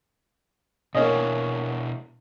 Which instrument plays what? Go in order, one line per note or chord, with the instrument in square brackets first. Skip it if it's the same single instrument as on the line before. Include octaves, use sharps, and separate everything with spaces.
[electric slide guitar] B2 D4 E4 [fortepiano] A#3 C#4 D#5